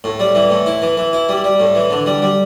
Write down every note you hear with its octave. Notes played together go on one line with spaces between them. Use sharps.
A2
G3
E3
A2
E4
E3
E3
E4
G3
G3
A2
E3
D3
G3
G3